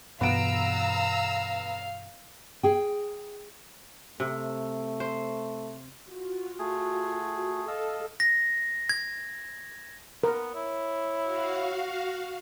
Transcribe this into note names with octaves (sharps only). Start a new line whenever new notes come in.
G2 B2 E3 B3 F5 A#5 E6 D7
G#4 G5
C3 A3
C5
F4 F#4
A3 G#4
A4 D#5 F5 E6
A#6
G#6
B3 A#4
E4 C#5
F#4 F5